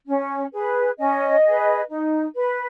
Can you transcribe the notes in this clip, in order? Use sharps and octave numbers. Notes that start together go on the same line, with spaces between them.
C#4
G#4 B4
C#4 D#5
G#4 B4
D#4
B4